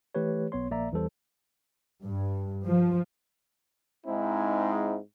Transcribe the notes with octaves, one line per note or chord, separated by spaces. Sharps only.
E3 A3 G4 B4 C#5
B1 B3 C#5 C6
A#1 A#3 D5 E5 A#5
E2 E3 G3 A4 C5
G2
F3
G#2 G#3 C4 D#4 E4